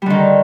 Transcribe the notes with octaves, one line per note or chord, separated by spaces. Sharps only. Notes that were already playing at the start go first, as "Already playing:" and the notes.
D3 D#3 G3